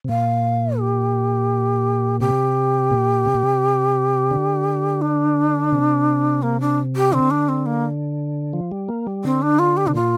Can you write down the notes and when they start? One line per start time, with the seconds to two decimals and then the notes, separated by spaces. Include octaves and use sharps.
0.04 C3
0.09 A#2 F5
0.79 G4
2.20 C3 G4
2.91 A#2
3.26 C3
3.35 A#2
3.43 C3
4.31 D3
5.02 D4
5.72 C3
6.43 A#3
6.61 D4
6.96 G4
7.13 D3 C4
7.31 D4
7.49 C4
7.66 A#3
8.53 F3
8.72 G3
8.89 A#3
9.07 G3
9.24 D3 C4
9.42 D4
9.59 F4
9.77 G4
9.87 C3 D4
9.95 A#2 F4